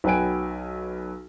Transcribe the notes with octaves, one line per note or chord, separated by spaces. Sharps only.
B1 F#3 B4 G5 G#5 D7